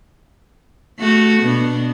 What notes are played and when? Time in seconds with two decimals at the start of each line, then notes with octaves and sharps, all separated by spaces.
1.00 A3 F#4
1.42 B2 B3 D4